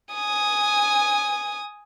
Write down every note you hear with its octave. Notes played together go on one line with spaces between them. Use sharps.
G#5 D#6